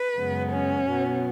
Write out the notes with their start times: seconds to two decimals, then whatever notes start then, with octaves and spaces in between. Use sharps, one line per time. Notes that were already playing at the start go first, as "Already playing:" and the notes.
Already playing: B4
0.17 F#2 C#3 G#3 B3
0.52 C#4
0.88 B2 F#3 B3